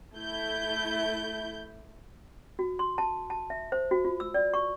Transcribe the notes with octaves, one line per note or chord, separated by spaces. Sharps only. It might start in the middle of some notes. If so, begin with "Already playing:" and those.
A3 E4 G6
F#4
C6
A5
A5
E5
C5
F#4
F4
E6
D5
C#6